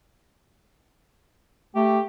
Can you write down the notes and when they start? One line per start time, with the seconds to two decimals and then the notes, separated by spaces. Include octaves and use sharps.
1.75 A3 G4